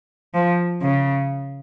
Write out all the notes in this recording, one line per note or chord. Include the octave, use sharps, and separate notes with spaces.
F3
C#3